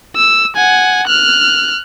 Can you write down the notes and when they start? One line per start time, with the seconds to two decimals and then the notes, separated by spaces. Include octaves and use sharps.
0.16 E6
0.57 F#5 G#5
1.07 F6 F#6